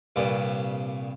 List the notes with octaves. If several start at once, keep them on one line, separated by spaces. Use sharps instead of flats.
C2 G2 A#2